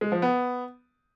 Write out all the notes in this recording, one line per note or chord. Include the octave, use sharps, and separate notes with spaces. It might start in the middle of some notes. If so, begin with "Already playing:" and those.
G#3
F3
B3